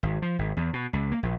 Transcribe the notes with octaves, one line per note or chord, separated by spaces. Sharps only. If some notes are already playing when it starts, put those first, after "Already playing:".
G#1
F3
G#1
E2
B2
C#2
A#3
A#1